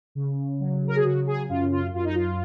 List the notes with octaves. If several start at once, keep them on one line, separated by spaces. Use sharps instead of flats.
C#3
F#3
A#4
G#4
C#3 F#4
G#4
F#2 F4
F4
F#2 F4
D#4
F4